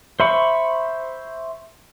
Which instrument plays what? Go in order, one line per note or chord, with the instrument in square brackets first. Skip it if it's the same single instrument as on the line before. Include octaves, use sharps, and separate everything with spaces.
[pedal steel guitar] C5 E5 B5 C#6